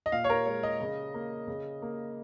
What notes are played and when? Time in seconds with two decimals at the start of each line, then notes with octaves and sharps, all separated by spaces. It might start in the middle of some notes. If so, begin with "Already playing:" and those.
0.06 D#5
0.12 A#2 F5
0.24 C#5
0.30 A#4
0.46 G#3 C#5
0.63 D#5
0.80 C#3
1.14 A#3
1.47 C#3
1.82 A#3